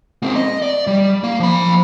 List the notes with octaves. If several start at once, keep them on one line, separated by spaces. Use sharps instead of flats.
G#3 C4
D#5
D5
G3
A#3
F3 B5